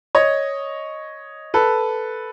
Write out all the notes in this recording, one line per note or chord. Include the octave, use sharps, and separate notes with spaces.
C#5 D#5
A4 B4